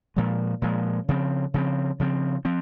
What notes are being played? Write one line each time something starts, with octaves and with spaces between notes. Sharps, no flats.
A#2 F3 G#3
A#2 F3 G#3
C#3 F3 C4
C#3 F3 C4
C#3 F3 C4
F3 C4